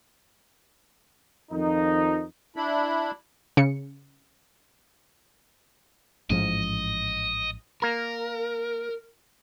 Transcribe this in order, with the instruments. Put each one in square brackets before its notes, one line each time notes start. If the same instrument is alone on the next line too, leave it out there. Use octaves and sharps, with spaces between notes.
[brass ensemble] F2 D#3 F3 D#4
[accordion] D4 E4 B5
[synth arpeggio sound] C#3 C#7
[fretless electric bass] A1 G#2 F3 [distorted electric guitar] D#5
[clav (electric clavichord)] A#3 A#5 [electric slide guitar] A#4